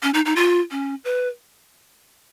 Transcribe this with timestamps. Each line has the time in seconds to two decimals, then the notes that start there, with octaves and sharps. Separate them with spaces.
0.03 C#4
0.14 D#4
0.25 D#4
0.36 F4
0.71 C#4
1.04 B4